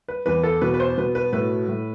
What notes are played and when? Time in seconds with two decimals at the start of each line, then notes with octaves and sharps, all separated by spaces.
0.08 B4
0.26 E2 B4
0.43 A4
0.61 B2 B4
0.74 B4
0.80 C5
0.98 B2 B4
1.15 B4
1.32 A2 B4
1.68 A2